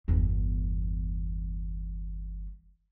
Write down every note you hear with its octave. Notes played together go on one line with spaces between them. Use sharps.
G1 E2